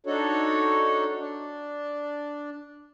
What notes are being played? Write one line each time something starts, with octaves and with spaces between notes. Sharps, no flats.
D4 D#4 F#4 A4 C#5
D4